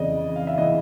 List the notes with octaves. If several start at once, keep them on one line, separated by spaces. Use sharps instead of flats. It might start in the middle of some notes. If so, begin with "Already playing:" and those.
Already playing: F2 C#3 E3 D5 D#5
F5
E5
C#3 E3 D#5